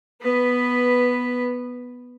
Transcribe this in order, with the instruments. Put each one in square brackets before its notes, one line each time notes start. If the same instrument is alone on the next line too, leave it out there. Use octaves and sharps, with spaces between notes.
[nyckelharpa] B3 B4